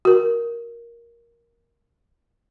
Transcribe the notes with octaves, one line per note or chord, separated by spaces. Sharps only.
F#4 A#4